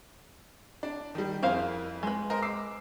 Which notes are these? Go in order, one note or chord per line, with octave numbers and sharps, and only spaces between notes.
D4
D#3 G3
F2 E4 G#4 A#4 C5 F5
G#3 B4
A#4 C5 D#5
D6 E6 C7